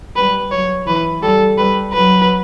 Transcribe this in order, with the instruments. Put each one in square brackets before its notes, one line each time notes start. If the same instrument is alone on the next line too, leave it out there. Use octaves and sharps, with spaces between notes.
[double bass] G3 [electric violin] B4
[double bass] F#3 [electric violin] C#5
[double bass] E3 [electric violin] B4
[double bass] G3 [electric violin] A4
[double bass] G3 [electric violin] B4
[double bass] F#3 [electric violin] B4